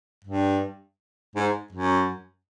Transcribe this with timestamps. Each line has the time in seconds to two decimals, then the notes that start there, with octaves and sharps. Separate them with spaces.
0.25 G2
1.36 G#2
1.73 F#2